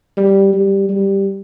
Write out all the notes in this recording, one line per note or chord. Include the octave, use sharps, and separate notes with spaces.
G3
G3
G3